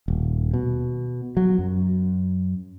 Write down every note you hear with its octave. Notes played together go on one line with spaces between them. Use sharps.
D#1
B2
F#3
F#2